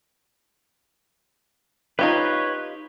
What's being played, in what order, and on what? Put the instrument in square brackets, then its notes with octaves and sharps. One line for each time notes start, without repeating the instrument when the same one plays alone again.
[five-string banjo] D#4 F4 G4 [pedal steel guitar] B4 C#5